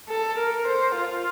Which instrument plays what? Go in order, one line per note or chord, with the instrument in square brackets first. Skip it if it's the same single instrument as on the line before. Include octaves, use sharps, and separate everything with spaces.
[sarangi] A4
A#4
C5
F4